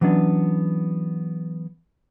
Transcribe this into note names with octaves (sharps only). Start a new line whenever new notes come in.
E3 F#3 B3 C#4 D4